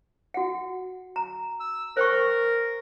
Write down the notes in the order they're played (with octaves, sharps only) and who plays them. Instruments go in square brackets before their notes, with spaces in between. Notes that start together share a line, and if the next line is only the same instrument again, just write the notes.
[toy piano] F#4 F#5
A#5
[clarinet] E6
[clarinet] A#4 [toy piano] C5 G5 C#6